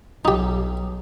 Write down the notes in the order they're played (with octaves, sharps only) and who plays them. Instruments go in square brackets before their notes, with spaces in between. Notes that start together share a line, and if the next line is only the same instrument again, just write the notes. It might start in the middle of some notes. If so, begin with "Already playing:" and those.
[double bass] B1 [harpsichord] D#4 G4